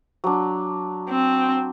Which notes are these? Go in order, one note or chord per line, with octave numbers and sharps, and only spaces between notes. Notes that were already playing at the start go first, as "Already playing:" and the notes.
F#3 D4
C4